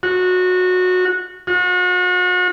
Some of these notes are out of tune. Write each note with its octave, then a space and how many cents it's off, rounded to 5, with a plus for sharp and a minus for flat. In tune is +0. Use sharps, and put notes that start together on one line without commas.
F#4 -20
F#4 -40